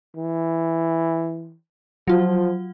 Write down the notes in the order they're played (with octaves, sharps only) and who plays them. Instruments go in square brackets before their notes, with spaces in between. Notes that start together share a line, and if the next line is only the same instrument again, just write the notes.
[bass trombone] E3
[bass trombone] F3 [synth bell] F#3 F4